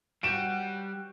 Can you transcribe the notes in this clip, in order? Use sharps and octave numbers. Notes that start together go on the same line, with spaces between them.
G3 F#4 G4 F#5 G5 D7 E7